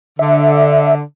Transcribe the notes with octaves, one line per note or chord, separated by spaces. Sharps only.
D3 E5